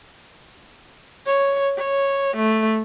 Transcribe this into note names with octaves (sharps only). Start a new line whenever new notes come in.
C#5
C#5
A3